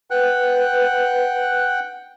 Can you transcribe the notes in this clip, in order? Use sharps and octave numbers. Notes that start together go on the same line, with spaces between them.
B4 F#5 G5 F#6